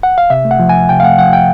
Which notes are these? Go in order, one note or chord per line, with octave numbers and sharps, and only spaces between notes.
F#5
F5
C3 E5
A3
F#5
F3
D2 G#5
C3 G5
F5
A3 F#5
F3 F#5
G5